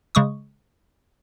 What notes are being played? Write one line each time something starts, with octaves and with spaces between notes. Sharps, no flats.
C#3 G#3 C#6 D#6